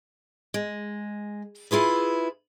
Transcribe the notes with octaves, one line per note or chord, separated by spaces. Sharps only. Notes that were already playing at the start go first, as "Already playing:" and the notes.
G#3
E4 F4 G#4 B4